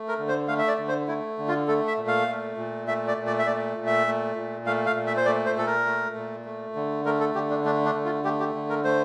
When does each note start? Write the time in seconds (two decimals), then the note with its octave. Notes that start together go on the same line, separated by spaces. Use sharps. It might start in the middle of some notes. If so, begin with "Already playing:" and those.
Already playing: A3
0.08 A#4
0.19 D3
0.28 C5
0.48 A3 F5
0.59 E5
0.67 D5
0.78 D3
0.88 C5
1.08 A3 E4
1.38 D3
1.48 F4
1.68 A3 A4
1.87 E5
1.98 A#2
2.08 F5
2.28 A3
2.57 A#2
2.88 A3 E5
3.07 D5
3.17 A#2
3.27 D5
3.39 E5
3.47 A3 D5
3.77 A#2
3.86 E5
4.07 A3
4.36 A#2
4.66 A3 F5
4.86 F5
4.96 A#2
5.07 E5
5.17 C5
5.26 A3 D5
5.46 C5
5.56 A#2 A4
5.66 A#4
5.86 A3
6.16 A#2
6.45 A3
6.75 D3
7.05 A3 A#4
7.20 A4
7.35 D3 G4
7.50 D4
7.64 A3 D4
7.85 D4
7.95 D3
8.05 F4
8.25 A3 G4
8.40 G4
8.55 D3
8.70 A#4
8.84 A3 C5